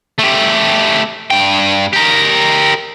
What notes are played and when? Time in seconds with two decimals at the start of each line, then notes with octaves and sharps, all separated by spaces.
0.18 A3 G4
1.31 G2 G5
1.93 G4 A#4